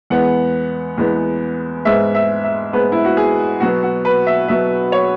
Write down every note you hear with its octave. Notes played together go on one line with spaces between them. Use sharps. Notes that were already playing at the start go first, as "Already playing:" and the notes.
E2 E3 G#3 B3 F#5
E2 E3 G#3 B3
G#2 G#3 B3 E5
E5
E5
G#2 G#3 B3 B4
E4
F#4
G#4
B2 F#3 B3 F#4
F#4
B4
E5
B2 F#3 B3 E5
C#5